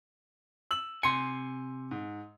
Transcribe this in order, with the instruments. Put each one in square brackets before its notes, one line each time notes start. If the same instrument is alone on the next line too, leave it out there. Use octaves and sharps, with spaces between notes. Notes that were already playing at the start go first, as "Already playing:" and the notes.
[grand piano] E6 F#7
[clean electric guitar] C3 G#5 [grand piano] C6 C#7
[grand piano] G#2